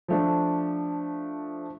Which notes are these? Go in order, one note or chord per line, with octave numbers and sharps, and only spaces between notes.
F3 A3 D4